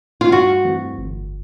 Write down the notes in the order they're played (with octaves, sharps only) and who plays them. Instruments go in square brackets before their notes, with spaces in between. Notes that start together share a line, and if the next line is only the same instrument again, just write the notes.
[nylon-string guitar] F4
[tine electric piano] G2 [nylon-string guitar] F#4
[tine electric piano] E3 A3 C4
G1